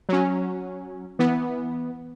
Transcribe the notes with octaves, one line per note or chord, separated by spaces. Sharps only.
F#3 C#4
E3 B3